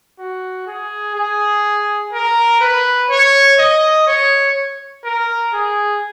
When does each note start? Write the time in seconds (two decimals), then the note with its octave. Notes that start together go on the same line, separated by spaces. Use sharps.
0.18 F#4
0.67 G#4
1.15 G#4
2.12 A#4
2.61 B4
3.10 C#5
3.58 D#5
4.07 C#5
5.04 A#4
5.53 G#4